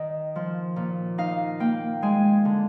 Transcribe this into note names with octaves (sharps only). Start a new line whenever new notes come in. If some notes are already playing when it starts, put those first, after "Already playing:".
Already playing: D#3 D#5
F3
A#2
D#4 F5
A#3 G5
G#3 G#5
D3